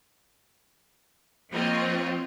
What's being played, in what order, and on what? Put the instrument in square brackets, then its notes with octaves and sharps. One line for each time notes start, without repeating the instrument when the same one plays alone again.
[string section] F3 A#3 C4 F4 C#5 D#5